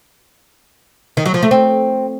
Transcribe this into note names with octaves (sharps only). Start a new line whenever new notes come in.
D#3
F#3
F3
A3
C4